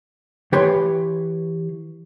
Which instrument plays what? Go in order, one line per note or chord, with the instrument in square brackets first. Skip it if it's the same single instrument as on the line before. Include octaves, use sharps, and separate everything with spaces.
[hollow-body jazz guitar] E3 G4 B4 C#5 C6